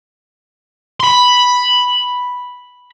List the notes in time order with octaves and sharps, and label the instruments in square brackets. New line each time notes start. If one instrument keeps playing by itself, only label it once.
[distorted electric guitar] B5 C6